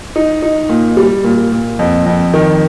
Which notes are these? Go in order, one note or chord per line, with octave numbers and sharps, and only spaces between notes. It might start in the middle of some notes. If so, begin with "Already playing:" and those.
D#4
D#4
A#2
G3
A#2
A#2
F2
F2
D#3